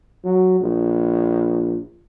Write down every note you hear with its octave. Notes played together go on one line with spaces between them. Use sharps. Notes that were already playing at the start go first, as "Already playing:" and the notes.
F#3
A#1